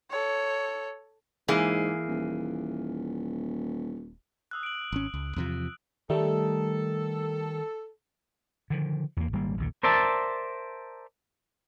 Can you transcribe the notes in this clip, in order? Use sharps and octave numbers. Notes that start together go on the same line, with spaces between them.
A4 C#5
G#2 E3 A#3 G#4
D#1
D#6 E6 F#6
D7 F#7
G#1 C#4
C#2
E2 C3 F3
D#3 G3 A3 A4
D3 D#3 F3
E2 A#3
G#1 G3 A#3
A#1 D#2 D3
A#4 C5 D5 E5 A5